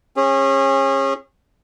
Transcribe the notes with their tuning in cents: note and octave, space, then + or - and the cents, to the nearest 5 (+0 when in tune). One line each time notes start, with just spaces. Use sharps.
C#4 -30 G#4 -30